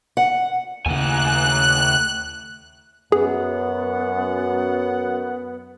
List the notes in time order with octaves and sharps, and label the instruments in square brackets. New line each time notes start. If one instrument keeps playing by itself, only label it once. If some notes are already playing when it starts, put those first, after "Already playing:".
[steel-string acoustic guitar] F#5
[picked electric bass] D#2 C#3 [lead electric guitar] A2 G#5 [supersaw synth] F#6
[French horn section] F#2 [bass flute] B3 [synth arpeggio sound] G#4 [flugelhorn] F#5